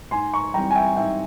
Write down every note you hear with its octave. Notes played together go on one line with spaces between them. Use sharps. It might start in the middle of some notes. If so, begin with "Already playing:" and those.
G#2 G#5 C6
A#5 C#6
E3 G3 C4 G5 A#5
G#5
E5 G5
G#2 E5 G5